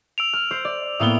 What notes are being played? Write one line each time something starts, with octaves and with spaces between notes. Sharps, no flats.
E6 D7 F7
F6
C5
D5
A2 A#3 B3 D#6 E6 G7